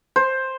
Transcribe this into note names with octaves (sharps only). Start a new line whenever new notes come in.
C5